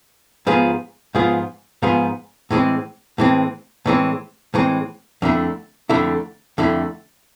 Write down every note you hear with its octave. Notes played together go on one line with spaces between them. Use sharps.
G#2 F3 B3 F4 G#4
G#2 F3 B3 F4 G#4
G#2 F3 B3 F4 G#4
A2 E3 G#3 C4
A2 E3 G#3 C4
A2 E3 G#3 C4
A2 E3 G#3 C4
F2 D3 A3 E4
F2 D3 A3 E4
F2 D3 A3 E4